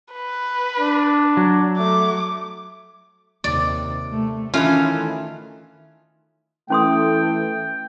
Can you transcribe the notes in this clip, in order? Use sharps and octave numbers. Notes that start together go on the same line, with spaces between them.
B4
D4
F#3
A3 D6
D#2 C3 D5
C3 A3
D#3 E3 A3 C#4 F4
E3 A3 C#4 G5 C6 D#6